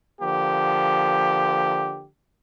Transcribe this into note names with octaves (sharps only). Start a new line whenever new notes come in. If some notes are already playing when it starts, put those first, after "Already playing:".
D3 F3 A#3 G4